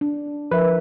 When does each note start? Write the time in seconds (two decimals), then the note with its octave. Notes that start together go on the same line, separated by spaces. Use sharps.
0.01 D4
0.51 F3 A#4 B4 E5